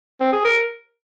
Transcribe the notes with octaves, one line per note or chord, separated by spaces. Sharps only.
C4
G#4
A#4